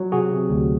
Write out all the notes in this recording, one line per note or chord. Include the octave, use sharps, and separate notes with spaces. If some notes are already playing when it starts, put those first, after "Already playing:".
Already playing: F#3
C3 F#4 G#4
C3
D2